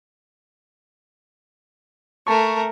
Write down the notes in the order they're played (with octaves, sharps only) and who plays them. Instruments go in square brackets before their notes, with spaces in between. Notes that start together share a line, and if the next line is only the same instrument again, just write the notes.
[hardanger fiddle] A3 A#4 [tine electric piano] A5 C#6